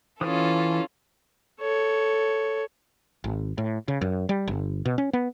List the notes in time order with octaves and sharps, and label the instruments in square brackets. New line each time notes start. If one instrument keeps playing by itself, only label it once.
[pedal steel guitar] E3 D#6 [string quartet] C#4 F4 A4
[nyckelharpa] A4 C#5
[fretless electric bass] G#1
A2
C#3
F#2
G3
G1
B2
C#4
B3